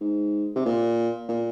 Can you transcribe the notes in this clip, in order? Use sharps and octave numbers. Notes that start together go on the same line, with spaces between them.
G#2
C3
A#2
A#2